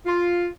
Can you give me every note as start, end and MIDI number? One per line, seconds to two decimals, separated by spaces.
0.06 0.48 65